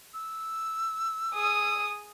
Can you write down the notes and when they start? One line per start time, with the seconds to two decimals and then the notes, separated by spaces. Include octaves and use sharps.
0.14 E6
1.34 G#4 D#6